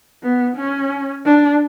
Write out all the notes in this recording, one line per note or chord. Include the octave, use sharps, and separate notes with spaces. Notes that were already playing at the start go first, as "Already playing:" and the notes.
B3
C#4
D4